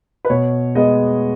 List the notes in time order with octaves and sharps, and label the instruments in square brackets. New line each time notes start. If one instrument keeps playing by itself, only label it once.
[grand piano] B4
B2 C#5
G#3 B3 D#5